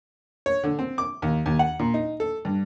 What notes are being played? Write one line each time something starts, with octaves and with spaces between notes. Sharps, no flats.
C#5
D3
C4
D6
D#2
D#2
F#5
A#2
D#4
A4
G2